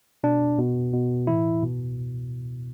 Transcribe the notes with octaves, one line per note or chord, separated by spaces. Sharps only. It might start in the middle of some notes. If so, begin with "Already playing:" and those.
B2 D4
B2
B2
A2 E3 E4
B2